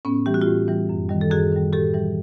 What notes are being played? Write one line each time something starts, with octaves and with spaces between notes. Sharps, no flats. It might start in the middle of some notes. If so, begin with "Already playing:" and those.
A2 B3 C#4
E3 G3 G4
F#4
F4 G4
A2
E3 G3
F#2
D#3 G3
A4
F#2 F#4 G#4
D#3 G3
A2 G4 A4
E3 G3